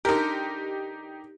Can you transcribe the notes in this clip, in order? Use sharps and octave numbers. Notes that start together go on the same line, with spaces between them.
D3 D#4 G4 A#4